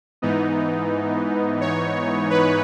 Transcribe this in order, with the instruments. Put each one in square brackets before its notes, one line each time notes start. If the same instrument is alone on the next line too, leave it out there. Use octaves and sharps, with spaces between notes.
[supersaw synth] G#2 E3 B3 D#4
C#5
B4